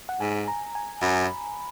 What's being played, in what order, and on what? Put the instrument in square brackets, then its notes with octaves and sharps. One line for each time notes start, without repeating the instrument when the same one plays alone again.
[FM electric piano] F#5
[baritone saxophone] G#2 [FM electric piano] G#5
[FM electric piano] A#5
G#5
[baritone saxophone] F#2 [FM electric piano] B5